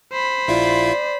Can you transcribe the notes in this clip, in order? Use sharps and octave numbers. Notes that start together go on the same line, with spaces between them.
C5 B5
A#1 E4 F4 D5